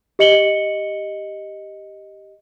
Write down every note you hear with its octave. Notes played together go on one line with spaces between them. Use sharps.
G4 D#5 C#7 F#7 G7